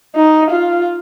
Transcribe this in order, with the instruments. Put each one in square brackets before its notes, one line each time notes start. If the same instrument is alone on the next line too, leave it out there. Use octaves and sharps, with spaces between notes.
[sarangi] D#4
F4